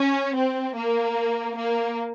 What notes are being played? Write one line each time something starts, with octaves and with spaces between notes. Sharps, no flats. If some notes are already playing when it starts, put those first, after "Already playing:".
Already playing: C#4
C4
A#3
A#3